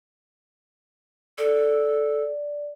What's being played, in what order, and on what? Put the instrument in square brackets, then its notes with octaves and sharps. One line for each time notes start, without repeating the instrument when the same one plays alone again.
[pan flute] A4 [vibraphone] D5